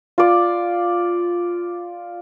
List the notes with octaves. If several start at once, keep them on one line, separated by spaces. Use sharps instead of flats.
F4 D5